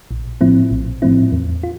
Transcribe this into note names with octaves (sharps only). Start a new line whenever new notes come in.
A#1
A2 F3 C4 E4
A#1
A2 F3 C4 E4
E2
F4